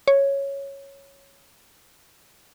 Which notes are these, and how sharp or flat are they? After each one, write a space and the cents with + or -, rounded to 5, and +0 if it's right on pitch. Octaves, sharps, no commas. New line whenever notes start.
C#5 -5